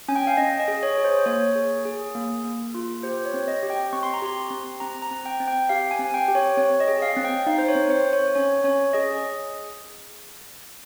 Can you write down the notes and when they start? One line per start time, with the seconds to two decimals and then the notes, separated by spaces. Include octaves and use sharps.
0.08 C#4 G#5
0.16 G5
0.27 F5
0.37 C#4 D#5
0.60 D#5
0.68 G#4
0.83 C#5
0.95 G#4 C#5
1.05 C5
1.26 A#3 C#5
1.56 G#4
1.85 G#4
2.15 A#3
2.44 A#3
2.75 F4
3.03 G4 C5
3.26 C#5
3.34 C4
3.48 D#5
3.63 G4
3.70 G5
3.93 C4 C#6
4.03 C6
4.14 A#5
4.22 G4 C6
4.51 C4
4.80 C4 A#5
5.02 A#5
5.11 C4
5.26 G5
5.40 C4
5.48 G5
5.69 G4 F5
5.91 G#5
5.99 C4
6.14 G5
6.28 G4
6.35 C#5
6.57 C4 C#5
6.80 D#5
6.88 G#4
7.02 F5
7.17 C4
7.25 G5
7.46 D#4 F5
7.58 C5
7.68 C#5
7.75 C4
7.90 C5
8.06 C4
8.13 C#5
8.35 C#4 C#5
8.64 C#4 C#5
8.93 G#4 D#5